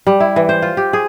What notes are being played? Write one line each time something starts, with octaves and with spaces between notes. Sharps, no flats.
G3
E4
E3
C5
F4
G4
G#4